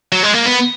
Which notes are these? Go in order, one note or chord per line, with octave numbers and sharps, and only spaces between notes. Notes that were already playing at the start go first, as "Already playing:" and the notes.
F#3
G#3
A#3
B3